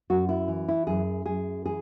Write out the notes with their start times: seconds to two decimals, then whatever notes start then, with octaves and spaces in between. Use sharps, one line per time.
0.10 F#2 F#4
0.29 E4
0.48 E3
0.68 E4
0.87 F#2 G#4
1.26 F#2 G#4
1.66 E3 G#4